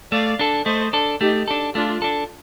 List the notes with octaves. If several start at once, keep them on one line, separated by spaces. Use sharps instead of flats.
A3 D5 F5
D4 A4
A3 C5 D#5
D4 A4
A3 D#4 G4
D4 A4
A3 D4 F4
D4 A4